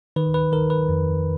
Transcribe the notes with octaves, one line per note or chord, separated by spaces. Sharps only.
D#3 B4
B4
D#3 A#4
B4
F2